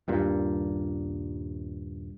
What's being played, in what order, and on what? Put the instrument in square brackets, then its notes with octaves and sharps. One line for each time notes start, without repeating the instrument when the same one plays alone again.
[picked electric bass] D#1 G2 A#2